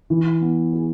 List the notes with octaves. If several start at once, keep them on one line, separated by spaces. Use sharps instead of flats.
E3
B3
G#4